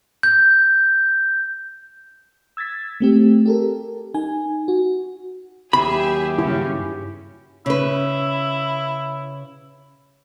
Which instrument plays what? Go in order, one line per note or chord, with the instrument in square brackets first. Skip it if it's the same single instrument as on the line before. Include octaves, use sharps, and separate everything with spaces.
[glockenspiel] G6
[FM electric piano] E6 G#6 A6 B6
A3 C4 G4
G4 A4 A#4
D#4 G#5
F#4
[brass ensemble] D#2 F#3 G4 [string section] G#4 E5 [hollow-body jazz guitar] B5
[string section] G2 C#3 C#4 [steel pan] E4
[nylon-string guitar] C#3 B4 [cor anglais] E4